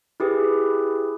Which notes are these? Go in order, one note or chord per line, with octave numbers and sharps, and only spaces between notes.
E4 G4 G#4 B4